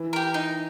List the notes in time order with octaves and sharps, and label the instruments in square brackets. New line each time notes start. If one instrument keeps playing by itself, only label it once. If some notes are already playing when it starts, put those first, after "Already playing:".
Already playing: [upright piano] E3
[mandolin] G4 A#4
D#4